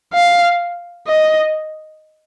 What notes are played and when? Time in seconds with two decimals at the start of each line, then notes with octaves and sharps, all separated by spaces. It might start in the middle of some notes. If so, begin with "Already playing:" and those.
0.14 F5
1.08 D#5